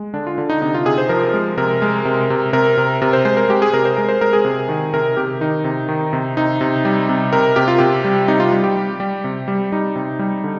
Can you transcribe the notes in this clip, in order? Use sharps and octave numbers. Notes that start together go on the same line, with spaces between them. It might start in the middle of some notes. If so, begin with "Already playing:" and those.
Already playing: G#3
D3 D4
F4
D3
D#4
C3 D#4
F4
C3 G#4
C5
F3 A#4
G#3
C3 A#4
G#3
C3
C3
C3 A#4
C3
C3 A#4
C5
G#3 C5
A#4
G#3 G4
G#4
C3 A#4
C5
G#3 A#4
C5
G#3 A#4
G#4
C3
D#3
C3 A#4
C3 G4
D#3 D#4
C3
D#3
C3
C3 D#4
C3
G3
C3
C3 A#4
C3 G4
F4
C3 G4
G3
C3 D#4
F4
G3
G4
G3
G3
C3
G3
G3 D#4
C3
G3
D3